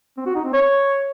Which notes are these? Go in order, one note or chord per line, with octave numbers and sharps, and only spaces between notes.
C4
F#4
D#4
C4
C#5